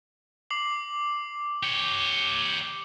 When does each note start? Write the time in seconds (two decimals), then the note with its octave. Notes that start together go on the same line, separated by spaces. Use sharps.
0.50 D6 C7 F#7
1.63 G4 C#5